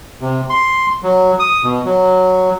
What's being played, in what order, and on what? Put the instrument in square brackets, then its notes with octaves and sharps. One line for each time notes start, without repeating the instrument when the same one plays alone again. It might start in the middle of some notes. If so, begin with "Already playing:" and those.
[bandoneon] C3
C6
F#3
D#6
B2
F#3